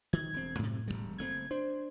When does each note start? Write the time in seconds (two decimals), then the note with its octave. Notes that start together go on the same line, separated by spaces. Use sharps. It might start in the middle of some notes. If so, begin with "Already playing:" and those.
0.13 D#3 G#6
0.33 E1 C4
0.59 F#2 A2 C3
0.88 E1 F#2 G3
1.18 F#1 A3 C4 G#6
1.51 D4 C5